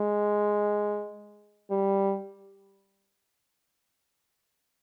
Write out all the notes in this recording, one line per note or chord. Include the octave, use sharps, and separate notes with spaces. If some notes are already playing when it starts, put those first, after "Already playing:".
Already playing: G#3
G3